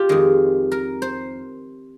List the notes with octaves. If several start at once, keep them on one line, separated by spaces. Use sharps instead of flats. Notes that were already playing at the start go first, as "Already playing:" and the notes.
Already playing: F4 G4
F2 D#3 G#3
A#4
C5